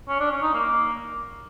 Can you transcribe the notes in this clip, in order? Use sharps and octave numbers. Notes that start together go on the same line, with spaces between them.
C#4
D4
C#4
D#4
A#3